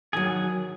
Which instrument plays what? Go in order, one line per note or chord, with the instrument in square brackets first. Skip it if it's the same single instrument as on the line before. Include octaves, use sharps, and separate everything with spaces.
[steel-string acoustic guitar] D#3 F#3 [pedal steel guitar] G#4